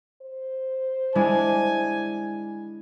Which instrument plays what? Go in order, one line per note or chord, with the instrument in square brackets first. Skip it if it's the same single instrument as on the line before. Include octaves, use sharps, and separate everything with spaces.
[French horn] C5
[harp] G#3 D4 E4 [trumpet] G#5